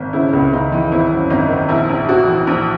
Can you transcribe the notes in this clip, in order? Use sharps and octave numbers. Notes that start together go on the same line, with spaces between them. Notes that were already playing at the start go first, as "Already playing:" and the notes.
Already playing: G#1
C#3 E4
C#2
C#2 D#4
E3
G#1 E4
F#2
G#1 D#4
D#3
A#1 E4
A#1
A#1 F#4
E3
A#1